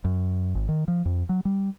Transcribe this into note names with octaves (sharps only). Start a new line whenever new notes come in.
F#2
G#1
D#3
F3
F2
F#3
G3